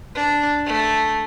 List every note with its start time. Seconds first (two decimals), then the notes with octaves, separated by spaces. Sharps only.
0.15 D4
0.66 A3